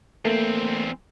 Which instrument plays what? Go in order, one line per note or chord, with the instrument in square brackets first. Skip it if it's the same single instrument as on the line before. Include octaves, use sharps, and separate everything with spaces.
[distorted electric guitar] E2 C4 [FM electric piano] A3 A#3